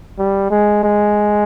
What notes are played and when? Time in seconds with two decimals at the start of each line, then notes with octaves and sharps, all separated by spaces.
0.19 G3
0.50 G#3
0.83 G#3